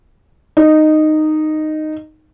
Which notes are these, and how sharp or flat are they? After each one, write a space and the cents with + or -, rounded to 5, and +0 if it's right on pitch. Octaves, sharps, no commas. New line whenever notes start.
D#4 -10